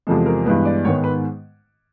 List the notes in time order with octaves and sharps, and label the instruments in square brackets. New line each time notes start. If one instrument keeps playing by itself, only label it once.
[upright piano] E2 C3 F3 G#3 A4
A#4
G2 E3 G#3 B3 B4
D5
G#2 D#3 G#3 B3 C#5
B4